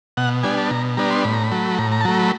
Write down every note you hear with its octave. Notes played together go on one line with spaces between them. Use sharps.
B2 F#5
G3 B3 D4 G#5
A5
B2 A#5
G3 B3 D4 A#5
C6
A2 B5
A#5
B5
F#3 A3
A2 A#5
A#5
A5
F#3 A3 A#5
B5